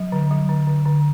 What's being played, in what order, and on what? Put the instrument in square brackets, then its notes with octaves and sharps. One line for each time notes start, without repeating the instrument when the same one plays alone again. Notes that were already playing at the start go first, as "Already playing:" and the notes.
Already playing: [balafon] F#3
D3
F#3
D3
D3
D3